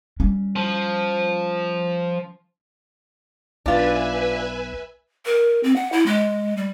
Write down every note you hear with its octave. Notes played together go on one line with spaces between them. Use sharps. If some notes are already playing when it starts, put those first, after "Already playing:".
G3 C#4
F3
B1 D4 F4 B4 E5 G#5
A#4
C4
F#5
E4
G#3
G3